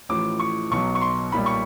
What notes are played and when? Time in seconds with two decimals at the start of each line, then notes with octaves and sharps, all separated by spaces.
0.09 A1 A2 F3 D6
0.40 C#6
0.71 B1 B2 F#3 C#6
0.95 C#6
1.01 C6
1.32 B1 A#2 G3 B5
1.46 C#6